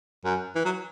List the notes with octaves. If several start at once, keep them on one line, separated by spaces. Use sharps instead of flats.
F#2
E3
F#3